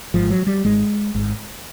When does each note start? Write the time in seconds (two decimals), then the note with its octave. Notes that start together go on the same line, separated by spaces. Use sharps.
0.14 G#1 G#2 F3
0.30 F#3
0.47 G3
0.64 G#1 G#2 G#3
1.15 G#1 G#2